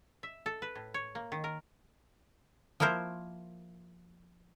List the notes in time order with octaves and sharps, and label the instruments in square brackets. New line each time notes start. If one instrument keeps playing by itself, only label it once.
[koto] E5
A4
B4
A2
C#5
A#3
D#3
A#4
F3 A#3 E4 A#4 C5